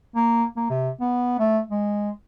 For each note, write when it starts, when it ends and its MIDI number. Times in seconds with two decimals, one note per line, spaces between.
0.16 0.45 58
0.57 0.67 58
0.70 0.90 48
1.01 1.37 59
1.39 1.60 57
1.70 2.10 56